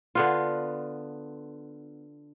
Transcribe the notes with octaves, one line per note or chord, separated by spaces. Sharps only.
D3 B3 F4